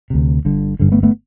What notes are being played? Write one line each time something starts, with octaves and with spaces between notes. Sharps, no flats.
D2 C3
G1 G2 D3
G1 G2 D3
A3 B3
A3 B3